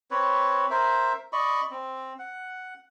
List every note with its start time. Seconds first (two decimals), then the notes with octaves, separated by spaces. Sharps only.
0.11 C4 B4 C#5
0.70 A#4 C5 E5
1.33 D5 D#5 B5 C#6
1.71 C4
2.19 F#5